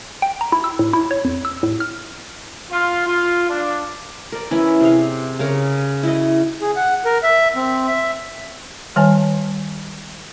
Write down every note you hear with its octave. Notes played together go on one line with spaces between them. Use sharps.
G5
A#5
E4
E6
A2
E4
C#5
F2
E6
A2
F6
F4
F4
D4
A#4 D5
E3 C#4 E4
C3 G#4 F5
C#3 A#4 C#5
E4 F#4 D#5
G#4
F#5
A#4
E5
C4
E5
D#3 G3 C#5 G#5 A5